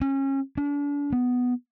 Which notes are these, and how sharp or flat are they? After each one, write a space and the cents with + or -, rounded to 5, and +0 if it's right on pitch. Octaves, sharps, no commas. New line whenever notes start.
C#4 -25
D4 -35
B3 +5